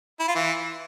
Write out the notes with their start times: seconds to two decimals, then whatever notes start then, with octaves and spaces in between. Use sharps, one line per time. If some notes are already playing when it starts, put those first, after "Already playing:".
0.20 E4
0.28 F4
0.35 E3